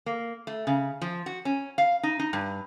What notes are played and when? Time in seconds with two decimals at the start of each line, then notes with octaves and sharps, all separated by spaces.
0.06 A#3
0.47 A3
0.67 C#3
1.02 F3
1.26 F#4
1.45 C#4
1.78 F5
2.03 D#4
2.19 D#4
2.33 G2